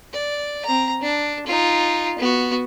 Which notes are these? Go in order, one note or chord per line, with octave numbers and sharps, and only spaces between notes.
D5
C4 A#5
D4
D#4 F4
B3 F#4